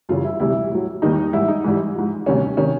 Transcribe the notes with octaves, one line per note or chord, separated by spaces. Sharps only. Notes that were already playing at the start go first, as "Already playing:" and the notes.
F#2 C#3 E3 G3 F4
E4
D2 C3 E3 G3 E4
A2 F#3
D#2 D#3 G3 D#4
G#2 E3 G3 E4
D#4
G#2 E3 G3
G#2 F3
D2 C3 D#3 G3 C#4
C3 D#3 C#4